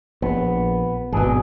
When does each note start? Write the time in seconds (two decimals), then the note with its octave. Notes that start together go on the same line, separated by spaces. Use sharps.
0.22 A#1 B3
1.13 G#1 B2 F#3 D4 G#4